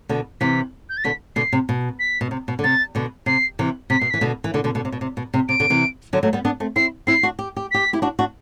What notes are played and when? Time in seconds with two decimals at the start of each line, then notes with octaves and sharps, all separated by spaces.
0.09 B2 D3
0.41 C3 E3 B6
0.89 G6
0.97 A6
1.04 B2 D3 B6
1.36 B2 D3 C7
1.52 C3
1.69 B2
1.99 B6
2.21 B2
2.31 C3
2.48 B2
2.59 D3
2.64 C3 A6
2.95 B2 D3
3.26 C3 C7
3.59 C3 E3
3.90 C3 B6
4.00 B2 C7
4.10 E3 B6
4.21 B2 D3
4.44 E3
4.54 B2 D3
4.64 B2 D3
4.75 B2 D3
4.85 C3
4.92 B2
5.01 C3
5.17 B2
5.34 C3
5.49 C3 D7
5.60 B2 D3
5.70 C3 E3
6.13 D3 F#3
6.23 F#3 A3
6.33 G3 B3
6.45 B3 D4
6.60 A3 C4
6.76 C4 E4 C7
7.07 C4 E4 C7
7.23 D4 F#4
7.39 G4
7.56 G4
7.71 G4 B6
7.93 E4 G4
8.02 D4 F#4
8.19 D4 F#4